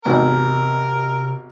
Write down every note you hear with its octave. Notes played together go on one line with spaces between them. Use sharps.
G#1 E2 C3 D#4 A#4